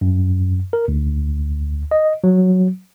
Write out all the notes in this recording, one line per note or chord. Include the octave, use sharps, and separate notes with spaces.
F#2
A#4
D2
D#5
F#3